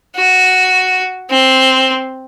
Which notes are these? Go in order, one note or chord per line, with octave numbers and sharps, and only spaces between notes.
F#4
C4